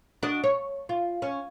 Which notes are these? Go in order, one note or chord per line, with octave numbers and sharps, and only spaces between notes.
D4 F#4 D#5
C#5
F4
C#4